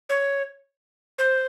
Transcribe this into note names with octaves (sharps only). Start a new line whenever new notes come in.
C#5
C5